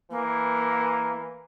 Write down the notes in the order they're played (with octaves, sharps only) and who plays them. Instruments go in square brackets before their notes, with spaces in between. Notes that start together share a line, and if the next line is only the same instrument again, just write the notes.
[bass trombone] E3 [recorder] A#3